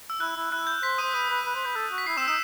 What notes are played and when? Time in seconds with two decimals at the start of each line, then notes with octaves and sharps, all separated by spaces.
0.10 E6
0.20 E4 F#6
0.37 E4
0.52 E4 F#6
0.67 G6
0.83 C5 B6
0.98 D#6 D#7
1.02 C5
1.14 B4 D#6 D#7
1.30 B4
1.45 B4
1.55 C5
1.65 B4
1.75 A4
1.92 F#4
1.98 B6
2.07 E4 C7
2.17 C4 E6 E7
2.28 D#4 E6 E7